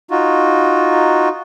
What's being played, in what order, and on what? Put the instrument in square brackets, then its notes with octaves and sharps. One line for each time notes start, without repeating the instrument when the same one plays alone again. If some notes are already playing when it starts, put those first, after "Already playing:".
[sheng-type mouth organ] D#4 F4 F#4